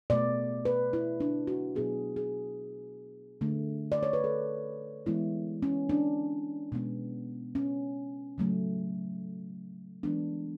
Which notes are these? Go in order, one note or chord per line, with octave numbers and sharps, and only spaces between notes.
B2 A3 D5
B4
E4
D4
F#4
B2 F#3 B3 G#4
G#4
D3 A3
D5
C#5
B4
A4
E3 G#3 B3 E4
C#4
D4
B2 G#3 B3
C#4
C#3 F#3 A3
E3 G#3 B3 D4